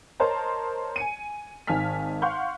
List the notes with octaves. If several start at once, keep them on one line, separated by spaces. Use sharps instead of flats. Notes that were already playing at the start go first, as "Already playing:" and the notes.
A#4 C5 C#5 D#5 A5 A#5
G#5 C#7 D#7
G#1 D#3 G#5 A5 F6 B6
F5 F#5 C6 C#6 F6 G6